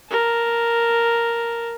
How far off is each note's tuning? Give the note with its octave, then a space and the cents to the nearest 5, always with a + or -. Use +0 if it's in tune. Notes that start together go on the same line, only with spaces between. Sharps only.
A#4 +0 A5 +0